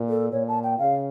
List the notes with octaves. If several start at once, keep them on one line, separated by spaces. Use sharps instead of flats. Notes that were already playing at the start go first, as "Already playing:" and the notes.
Already playing: A#2
A4
A#2 C#5
A5
G5
C#3 F5